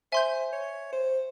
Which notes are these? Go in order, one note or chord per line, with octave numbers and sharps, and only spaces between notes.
C5 E5 G#5 C6 G6
C#5
C5